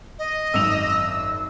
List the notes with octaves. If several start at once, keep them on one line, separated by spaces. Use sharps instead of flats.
D#5
G#1 F#2 E6 F7